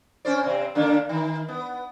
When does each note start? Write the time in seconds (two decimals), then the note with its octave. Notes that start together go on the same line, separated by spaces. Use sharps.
0.25 C#4 C5 D5
0.43 C3 C4
0.75 D3 A#3 D4
1.09 D#3
1.49 B3